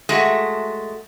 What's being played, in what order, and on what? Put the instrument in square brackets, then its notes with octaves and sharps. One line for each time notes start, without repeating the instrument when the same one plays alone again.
[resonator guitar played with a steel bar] G#3 A3 F#4